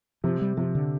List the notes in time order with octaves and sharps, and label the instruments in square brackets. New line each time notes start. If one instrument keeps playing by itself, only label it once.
[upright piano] C3 [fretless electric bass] F3
[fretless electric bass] G3
[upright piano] C3 [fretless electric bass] F3
[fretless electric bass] D3